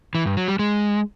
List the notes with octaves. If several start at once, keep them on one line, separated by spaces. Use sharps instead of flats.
E3
G2
F#3
G3
G#3